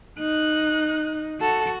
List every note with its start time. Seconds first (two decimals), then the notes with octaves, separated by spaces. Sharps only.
0.20 D#4 F#6
1.41 F#4 A4